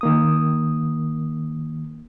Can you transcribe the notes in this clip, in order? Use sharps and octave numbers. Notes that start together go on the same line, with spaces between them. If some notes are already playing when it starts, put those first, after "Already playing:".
D#3 A#3 D#6